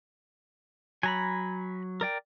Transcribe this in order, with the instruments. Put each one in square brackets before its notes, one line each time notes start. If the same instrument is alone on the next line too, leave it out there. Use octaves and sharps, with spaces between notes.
[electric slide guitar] F#3 [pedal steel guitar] G#5 A#5 B5
[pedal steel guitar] A#4 D5 G5